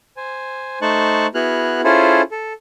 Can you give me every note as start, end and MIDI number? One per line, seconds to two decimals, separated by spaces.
0.17 0.79 72
0.17 0.79 80
0.82 1.27 57
0.82 1.27 63
0.82 1.27 72
0.82 1.27 81
0.82 1.27 85
0.82 1.27 90
1.35 1.81 59
1.35 1.81 64
1.35 1.81 66
1.35 1.81 68
1.35 1.81 89
1.35 1.81 90
1.84 2.21 61
1.84 2.21 64
1.84 2.21 65
1.84 2.21 68
1.84 2.21 69
1.84 2.21 72
2.31 2.53 69